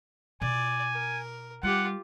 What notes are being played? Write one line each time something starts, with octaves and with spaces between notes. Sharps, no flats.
B2 F4 D5 G#5
A#4
G3 F4 G4 F#5